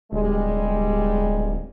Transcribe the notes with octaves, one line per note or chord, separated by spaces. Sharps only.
D1 G3 G#3